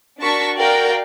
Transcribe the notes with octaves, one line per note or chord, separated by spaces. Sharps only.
D4 F#4 A#4 A5 C#6 B6
F#4 A#4 D5 F5 G5